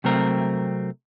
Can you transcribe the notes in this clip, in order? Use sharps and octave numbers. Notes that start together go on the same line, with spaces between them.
C3 F#3 A3 C4 A#4